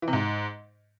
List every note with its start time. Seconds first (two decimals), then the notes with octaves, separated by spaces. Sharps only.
0.02 E3
0.08 C3
0.13 G#2